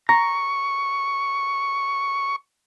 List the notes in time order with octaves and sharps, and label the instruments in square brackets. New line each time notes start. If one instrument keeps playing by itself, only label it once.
[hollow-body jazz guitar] A#5 [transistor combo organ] C#6